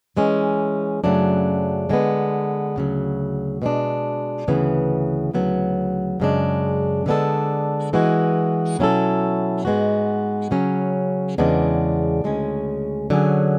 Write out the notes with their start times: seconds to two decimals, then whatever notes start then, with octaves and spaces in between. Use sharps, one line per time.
0.17 E3 G#3 C#4
1.04 F#2 C#3 F#3 A3 D4
1.90 D3 G#3 B3
2.76 D2 C#3 F#3
3.62 B2 G#3 D4
4.48 D2 C#3 E3 B3
5.34 D2 C#3 F#3 B3
6.20 F#2 C#3 G#3 D4
7.06 D3 G#3 B3 D4 A4
7.93 E3 G#3 B3 F#4
8.79 B2 F#3 C#4 E4 A4
9.65 G#2 G#3 B3 F#4
10.51 C#3 F#3 C#4
11.38 E2 C#3 G#3 B3 D4
12.24 D2 C#3 G#3 C#4
13.10 D3 F#3 C#4 G#4